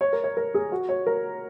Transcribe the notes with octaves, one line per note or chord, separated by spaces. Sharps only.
C#5
A#4
C#5
A#4
G#4
F#4
C#5
A#4